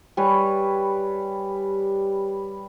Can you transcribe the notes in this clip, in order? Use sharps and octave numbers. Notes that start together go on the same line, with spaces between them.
G3 B4 C#5 G#5